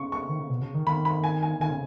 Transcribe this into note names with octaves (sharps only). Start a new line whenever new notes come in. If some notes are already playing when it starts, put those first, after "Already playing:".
Already playing: C#3 C#6
C#6
D#3
C#3
B2
C#3
D#3
D#3 B5
B5
G#5
G#5
D#3 G#5
C#3